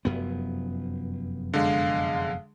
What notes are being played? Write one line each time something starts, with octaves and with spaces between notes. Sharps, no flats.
F1 F#2 B3
D3 G#3 F5